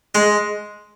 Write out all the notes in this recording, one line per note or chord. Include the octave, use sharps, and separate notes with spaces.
G#3 D#5